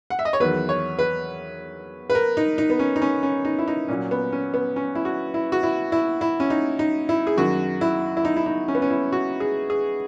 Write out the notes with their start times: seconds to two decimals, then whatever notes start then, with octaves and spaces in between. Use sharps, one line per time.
0.10 F#5
0.19 E5
0.25 D#5
0.33 C#5
0.40 E2 D#3 F#3 B4
0.69 C#5
0.99 B4
2.10 B4
2.15 A#4
2.37 D#4
2.58 D#4
2.70 B3
2.79 C#4
2.96 D#4
3.02 C#4
3.23 C#4
3.45 D#4
3.59 E4
3.68 D#4
3.88 A#2 F#3 C#4
4.11 B3
4.32 C#4
4.54 B3
4.76 C#4
4.95 E4
5.05 F#4
5.34 E4
5.52 F#4
5.63 E4
5.92 E4
6.21 E4
6.40 C#4
6.50 D#4
6.79 D#4
7.09 E4
7.27 G#4
7.37 F#2 D#3 F#3 F#4
7.81 E4
8.17 E4
8.25 D#4
8.37 E4
8.46 D#4
8.68 C#4
8.75 B3
8.82 C#4
8.90 E4
9.12 F#4
9.40 G#4
9.70 G#4